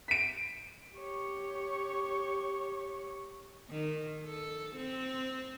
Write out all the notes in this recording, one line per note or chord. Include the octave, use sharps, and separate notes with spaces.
B6 D7
G4 C#5
D#3
A4
C4